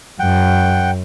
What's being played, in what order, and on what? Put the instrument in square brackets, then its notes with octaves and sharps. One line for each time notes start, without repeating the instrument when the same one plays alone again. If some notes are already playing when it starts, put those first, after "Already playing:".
[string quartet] F#2 [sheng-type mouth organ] F#5 G5